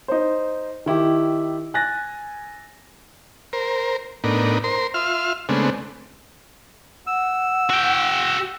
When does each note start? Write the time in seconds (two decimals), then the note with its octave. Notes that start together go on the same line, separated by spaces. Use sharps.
0.08 D#4 C5
0.86 D#3 E4 G4
1.74 G#5 F#6 A6 A#6
3.53 A#4 C5
4.24 A2 B3 D4 D#4 A#4
4.64 A#4 C5 C6
4.94 F4 E5 C6 F6
5.49 C#3 G#3 A3 B3 C4 D4
7.07 F#5 E6
7.70 F#4 G5